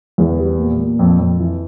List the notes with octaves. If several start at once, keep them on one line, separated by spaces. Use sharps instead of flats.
E2
G3
A#2
A#2
F2
F2
E3